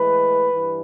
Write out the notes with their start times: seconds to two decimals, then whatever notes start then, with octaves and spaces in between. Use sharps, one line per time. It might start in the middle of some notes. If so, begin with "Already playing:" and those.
Already playing: A2 E3 G#3 B4
0.53 G2 E3